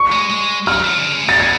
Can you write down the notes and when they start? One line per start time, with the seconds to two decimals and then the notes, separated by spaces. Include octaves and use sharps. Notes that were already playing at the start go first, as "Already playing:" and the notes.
Already playing: C#6
0.12 G#3
0.30 G#3
0.67 F#3 F6
0.85 F3
0.97 C#3
1.04 D3
1.15 C#3
1.23 A2
1.28 B2 A6
1.40 G#6